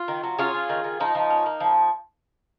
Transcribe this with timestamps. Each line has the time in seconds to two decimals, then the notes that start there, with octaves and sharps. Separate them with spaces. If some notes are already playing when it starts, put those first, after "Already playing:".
Already playing: F4
0.08 D#3
0.23 F#3
0.38 C#4 F4 G#4
0.54 C#4
0.69 D#3
0.84 D#3
1.00 F3 D#4
1.15 F3
1.30 C#4
1.46 A#3
1.60 F3